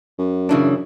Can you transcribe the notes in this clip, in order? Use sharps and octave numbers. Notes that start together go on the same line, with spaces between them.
F#2
C#3 E3 D4